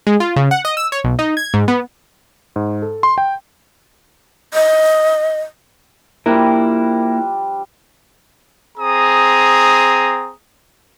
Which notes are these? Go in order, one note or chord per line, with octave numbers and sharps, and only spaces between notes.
G#3
F4
C#3
F#5
D#5
E6
C#5
B1
D#4
G#6
G#2
B3
G#2
A4
C6
G5
D#5
F3 G3 A#3 D4 E4 A#4
C4 G#4 A#5 D#6